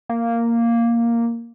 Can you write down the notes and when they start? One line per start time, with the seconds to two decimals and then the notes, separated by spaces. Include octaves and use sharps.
0.09 A#3